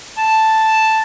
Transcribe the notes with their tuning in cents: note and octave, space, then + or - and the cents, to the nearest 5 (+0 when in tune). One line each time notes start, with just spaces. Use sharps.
A5 +0